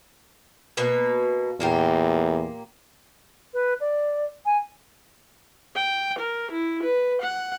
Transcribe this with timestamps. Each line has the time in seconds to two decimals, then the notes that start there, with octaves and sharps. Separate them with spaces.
0.77 B2 A#3 B4
1.60 E2 A#2 A#3 G4
3.53 B4
3.80 D5
4.46 G#5
5.76 G5
6.19 A#4
6.51 E4
6.83 B4
7.22 F#5